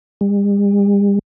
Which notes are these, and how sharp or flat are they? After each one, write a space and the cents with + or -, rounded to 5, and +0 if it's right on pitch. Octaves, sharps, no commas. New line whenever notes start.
G3 +45